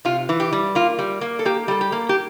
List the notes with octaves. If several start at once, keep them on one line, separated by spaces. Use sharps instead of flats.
C3 F4
E3
G4
G3
A#3 F4
G3
A#3
A4
A#3 G4
G3 A4
G4
A#3
G4